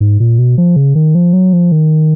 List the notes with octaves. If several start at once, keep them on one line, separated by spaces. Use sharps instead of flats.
G#2
A#2
B2
F3
C#3
D#3
F3
F#3
F3
D#3